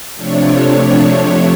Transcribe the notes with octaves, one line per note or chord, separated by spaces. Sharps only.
C3 F3 A3 D4 C#5
C#5